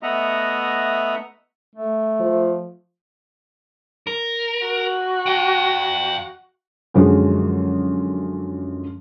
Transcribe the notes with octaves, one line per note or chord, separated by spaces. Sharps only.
A3 B3 D#5 E5 F#5 A#5
A3
F3
A#4
F#4
F5 G5
F#2 D3 F3 F#3 G#3